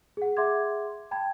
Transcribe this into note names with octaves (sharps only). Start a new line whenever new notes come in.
G#4 F#5
G#4 E5 F#5 C6 D6 G#6
G5 A5 B5 G#6